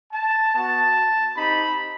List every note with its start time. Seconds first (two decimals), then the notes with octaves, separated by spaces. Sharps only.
0.12 A5
0.53 B3 F#4 A5
1.36 C4 D#4 G4 B5